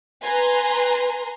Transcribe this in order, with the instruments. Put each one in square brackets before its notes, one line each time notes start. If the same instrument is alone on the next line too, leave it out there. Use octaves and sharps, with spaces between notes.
[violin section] B4 G#5 A#5 C6